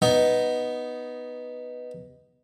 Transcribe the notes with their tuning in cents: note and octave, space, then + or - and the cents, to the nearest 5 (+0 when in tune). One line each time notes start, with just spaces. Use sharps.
B3 +0 D#4 +0